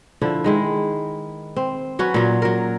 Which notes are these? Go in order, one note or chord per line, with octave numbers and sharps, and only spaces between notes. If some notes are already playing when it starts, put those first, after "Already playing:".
D3 F3 E4
D#3 G#3 E4
C4
F#3 C#4 F#4 B4
A#2 F#3 C#4
F#3 A#4